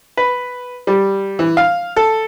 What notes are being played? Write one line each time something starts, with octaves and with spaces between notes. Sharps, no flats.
B4
G3
E3
F5
A4